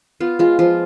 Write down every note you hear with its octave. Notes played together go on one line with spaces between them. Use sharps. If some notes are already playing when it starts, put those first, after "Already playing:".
B3 F4
G#3 F4
F3 F4